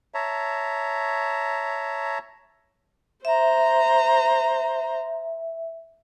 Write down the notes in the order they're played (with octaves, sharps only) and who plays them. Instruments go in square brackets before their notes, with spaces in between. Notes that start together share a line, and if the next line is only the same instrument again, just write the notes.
[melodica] C#5 E5 A5 A#5
[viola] C5 A#5 [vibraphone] E5